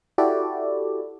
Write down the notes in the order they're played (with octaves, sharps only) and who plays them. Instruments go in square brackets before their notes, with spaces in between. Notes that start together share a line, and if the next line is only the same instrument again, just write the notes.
[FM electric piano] E4 F#4 G4 A4 D5